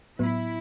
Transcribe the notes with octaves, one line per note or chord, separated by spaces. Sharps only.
A2 F#3 B3 E4